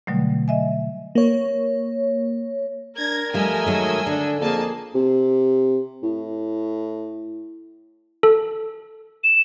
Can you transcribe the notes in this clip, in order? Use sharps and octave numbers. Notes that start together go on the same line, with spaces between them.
B2 D3 F#3 G3 A3
D#5 E5 G#5
A#3 C#5
D4 A#4 G#6 A#6
F3 G3 A3 D#5 G#5 E6
D#3 F#3 G#3
D3 D4
F2 A#3 G#4 G#5 A5
C3
A2
A4
E7